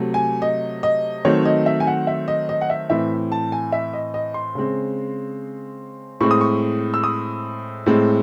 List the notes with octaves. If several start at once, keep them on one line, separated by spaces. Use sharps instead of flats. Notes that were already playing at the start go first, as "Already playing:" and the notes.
Already playing: C3 F#3 A3
G#5
D#5
D#5
D#3 F#3 A3 C4 C#5
D#5
E5
G#5
F#5
E5
D#5
D#5
F#5
E5
A2 E3 C4 E5
A5
G#5
E5
D#5
D#5
C6
C#3 G#3 C4
A2 G#3 C4 C#6
D#6
C#6
E6
D#6
A2 G#3 C4